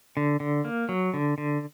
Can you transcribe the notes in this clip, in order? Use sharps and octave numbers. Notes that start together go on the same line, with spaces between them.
D3
D3
A#3
F#3
D3
D3